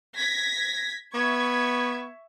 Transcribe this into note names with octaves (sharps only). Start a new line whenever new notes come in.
G#6 A#6 B6
B3 E5 C#6 G#6